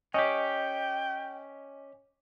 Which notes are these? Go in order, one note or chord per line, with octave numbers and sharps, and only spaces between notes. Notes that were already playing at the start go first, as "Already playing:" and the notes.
C#4 G4 D#5 G5